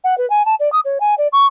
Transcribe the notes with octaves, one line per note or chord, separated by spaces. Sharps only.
F#5
B4
G#5
A5
D5
D#6
C#5
G#5
D5
C#6